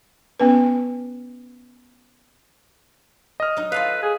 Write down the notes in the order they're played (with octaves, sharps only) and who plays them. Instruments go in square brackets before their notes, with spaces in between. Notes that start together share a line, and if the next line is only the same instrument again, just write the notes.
[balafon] B3 C#4 B4
[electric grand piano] D#5 F6
[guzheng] F#3 D#4
[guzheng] F4 A4 F5 [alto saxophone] B4
[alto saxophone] G#4